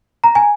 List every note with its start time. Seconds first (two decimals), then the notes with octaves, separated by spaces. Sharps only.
0.24 A#5
0.35 G#5